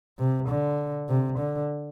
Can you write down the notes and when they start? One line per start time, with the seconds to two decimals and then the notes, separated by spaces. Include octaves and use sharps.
0.19 C3
0.49 D3
1.09 C3
1.39 D3